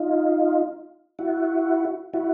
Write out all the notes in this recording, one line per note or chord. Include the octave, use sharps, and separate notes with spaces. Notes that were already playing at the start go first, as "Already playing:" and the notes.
Already playing: D#4 F4
E4 F#4
E4 F#4